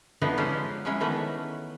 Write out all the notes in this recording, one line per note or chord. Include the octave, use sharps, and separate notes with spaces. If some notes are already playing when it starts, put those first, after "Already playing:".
D3 E3 F3 G3 B3 D#4
G#3 C#4 F4 G4 B4 C5
F3 F#3 G#3 C#4 E4
D#3 E3 A3 B3 B4